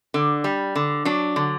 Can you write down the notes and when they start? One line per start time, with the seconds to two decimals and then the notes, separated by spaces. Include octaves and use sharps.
0.14 D3
0.44 G3
0.76 D3
1.05 F#3 D4
1.36 D3